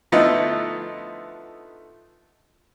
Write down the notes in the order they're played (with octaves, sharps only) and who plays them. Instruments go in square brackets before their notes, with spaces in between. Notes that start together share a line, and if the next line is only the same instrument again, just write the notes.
[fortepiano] D3 F3 A3 B3 D#4 E4